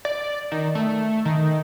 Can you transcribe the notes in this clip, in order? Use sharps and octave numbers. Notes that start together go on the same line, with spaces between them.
D5
D#3
A3
D#3